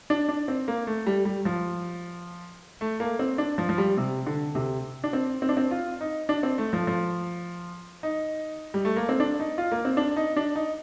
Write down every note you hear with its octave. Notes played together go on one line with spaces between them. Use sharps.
D4
D4
C4
A#3
A3
G3
G3
F3
A3
A#3
C4
D4
F3
F3
G3
C3
D3
C3
D4
C4
C4
D4
C4
F4
D#4
D4
C4
A3
F3
F3
D#4
G3
A3
A#3
C4
D4
D#4
F4
A#3
C4
D4
D#4
D4
D#4